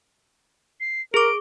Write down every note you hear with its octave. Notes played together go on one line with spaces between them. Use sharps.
C7
G#4 A#4 D6 D7